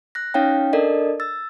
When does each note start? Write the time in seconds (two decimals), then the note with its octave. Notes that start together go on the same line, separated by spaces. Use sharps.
0.15 F#6 A#6
0.34 C#4 D#4 C#5 F5 G5
0.73 D4 A4 A#4 D5 D#5
1.20 E6 A6